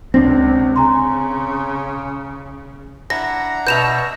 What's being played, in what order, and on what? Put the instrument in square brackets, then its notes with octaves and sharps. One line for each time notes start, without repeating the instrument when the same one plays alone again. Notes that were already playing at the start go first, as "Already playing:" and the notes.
[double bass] C#2 C3 [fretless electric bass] C4 D4 [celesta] A#6
[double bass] C#3 [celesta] G#5 A#5 C6
[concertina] D4 F#5 A#5 [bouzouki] E4 [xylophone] A#6
[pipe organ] B2 A#6 [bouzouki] B4 E5 [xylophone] G6 E7 F7